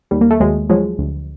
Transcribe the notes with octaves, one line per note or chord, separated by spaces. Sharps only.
D#2 G3
A#3
A3
D#2 F#3 G#3
F3 F#3 G#3
D2